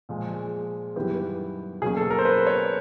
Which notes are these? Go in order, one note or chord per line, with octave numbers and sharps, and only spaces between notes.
A#2 F3 G#3
G#4
F#2 D#3 G3 B3 E4 G4
B2 F#3 A#3 C#4 G#4
A4
A#4
C5
B4
C#5